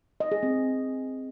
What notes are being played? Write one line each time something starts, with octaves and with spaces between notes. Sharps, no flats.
D#5
G#4
C4